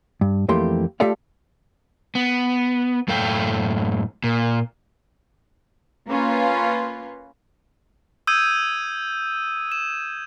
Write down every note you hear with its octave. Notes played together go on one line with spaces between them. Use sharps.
G2
F2 E3 A3 A#3 G4 C6
A3 F4 G4 A4 D5 F5
B3
F#2 A2 A4 F5 G5
A#2
A#3 C#4 F4 B4
D#6 E6 G6 G#6 D#7
E7